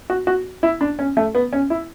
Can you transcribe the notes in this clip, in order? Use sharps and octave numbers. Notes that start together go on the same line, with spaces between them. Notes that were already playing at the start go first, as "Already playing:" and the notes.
F#4
F#4
E4
D4
C#4
A3
B3
C#4
E4